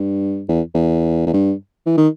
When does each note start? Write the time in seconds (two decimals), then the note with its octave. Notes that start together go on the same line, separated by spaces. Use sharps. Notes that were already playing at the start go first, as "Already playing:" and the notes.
Already playing: G2
0.48 E2
0.74 E2
1.27 E2
1.33 G2
1.86 E3
1.97 D#3